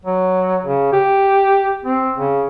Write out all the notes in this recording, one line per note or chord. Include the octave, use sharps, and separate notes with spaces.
F#3
C#3
G4
C4
C#3